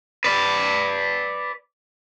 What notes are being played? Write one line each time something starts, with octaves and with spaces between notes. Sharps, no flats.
B4 D5